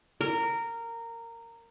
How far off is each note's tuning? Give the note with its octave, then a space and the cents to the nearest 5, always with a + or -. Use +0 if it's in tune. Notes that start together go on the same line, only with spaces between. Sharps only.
A#4 -15